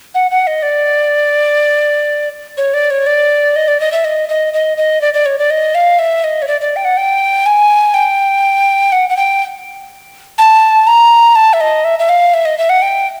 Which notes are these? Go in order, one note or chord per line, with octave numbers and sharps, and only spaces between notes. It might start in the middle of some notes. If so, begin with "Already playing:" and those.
F#5
F#5
D#5
D5
C#5
D5
C#5
D5
D#5
D5
D#5
E5
D#5
D#5
D#5
D#5
D5
D5
C#5
D5
D#5
F5
E5
D#5
C#5
D5
D5
G5
F#5
G5
G#5
G5
F#5
F#5
G5
A5
A#5
A5
E5
D#5
E5
E5
F5
E5
D#5
E5
F#5
G5